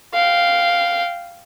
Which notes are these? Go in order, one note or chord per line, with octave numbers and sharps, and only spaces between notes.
F5 G5